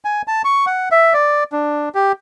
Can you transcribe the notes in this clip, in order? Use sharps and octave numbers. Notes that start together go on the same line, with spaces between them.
G#5
A5
C#6
F#5
E5
D5
D4
G4